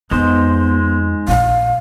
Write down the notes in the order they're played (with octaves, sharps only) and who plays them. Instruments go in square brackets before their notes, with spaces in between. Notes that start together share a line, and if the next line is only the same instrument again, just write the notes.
[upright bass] F2 [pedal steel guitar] G#3 D#4 C5 [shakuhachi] B3
[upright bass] A#1 [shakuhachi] F5